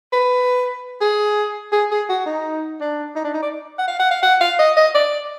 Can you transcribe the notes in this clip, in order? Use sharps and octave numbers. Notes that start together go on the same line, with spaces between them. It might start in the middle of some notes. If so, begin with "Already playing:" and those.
B4
G#4
G#4
G#4
F#4
D#4
D4
D#4
D4
D#4
D5
F#5
F5
F#5
F5
F#5
F5
D#5
D#5
D5